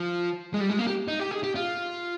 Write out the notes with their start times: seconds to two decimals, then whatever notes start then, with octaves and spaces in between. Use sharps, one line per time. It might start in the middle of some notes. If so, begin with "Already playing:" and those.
Already playing: F3
0.54 G#3
0.61 G3
0.70 G#3
0.79 A#3
0.87 G4
1.08 D#4
1.20 G4
1.31 G#4
1.43 G4
1.55 F4